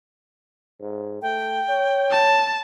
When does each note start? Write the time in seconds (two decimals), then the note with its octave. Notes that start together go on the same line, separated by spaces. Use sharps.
0.82 G#2
1.22 A3 G5
1.69 C#5
2.11 A5